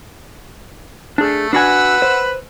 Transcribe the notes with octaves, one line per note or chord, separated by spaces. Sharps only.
A3 D4 G#4
D4 F#4 B4 F#5 G#5 E6
C5